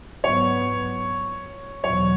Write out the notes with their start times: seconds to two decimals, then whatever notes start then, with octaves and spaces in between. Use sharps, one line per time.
0.23 G#2 F#3 B3 C#5
1.83 E2 B2 F#3 C#5